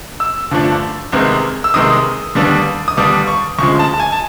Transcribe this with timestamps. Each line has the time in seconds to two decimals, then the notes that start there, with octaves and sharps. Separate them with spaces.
0.20 E6
0.51 G2 D3 F3 A3 D4
1.12 C2 C3 D#3 G#3 B3
1.64 E6
1.74 C2 C3 D#3 G#3 B3 D#6
2.35 D#2 D3 G3 B3 D4
2.88 D#6
2.97 D#2 D3 G3 B3 D4 D6
3.27 C#6
3.59 D2 C#3 F3 G#3 C#6
3.79 A5
3.94 A5
4.00 G#5
4.12 A5